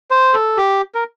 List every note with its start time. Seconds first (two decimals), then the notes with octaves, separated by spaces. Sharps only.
0.11 C5
0.34 A4
0.57 G4
0.95 A#4